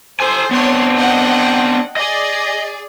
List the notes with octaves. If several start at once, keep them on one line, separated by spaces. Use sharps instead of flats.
A4 C5 G#5
B3 C4 D4 C#5 C6
D#5 F#5 G5
G#4 D5 D#5